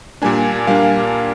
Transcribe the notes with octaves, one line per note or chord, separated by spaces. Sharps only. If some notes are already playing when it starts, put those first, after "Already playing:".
A#2 G3 A#3 D4 G#5
A#2 G3 A#3 D4 F5